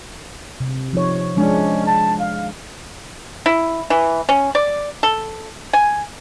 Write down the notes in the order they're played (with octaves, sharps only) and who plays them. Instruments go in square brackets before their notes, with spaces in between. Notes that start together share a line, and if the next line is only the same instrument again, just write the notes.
[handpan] C3
F3 D#4 C#5
[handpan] F3 G#3 D4 [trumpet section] C#4
[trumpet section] A5
F5
[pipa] E4
E3
C#4
D5
A4
G#5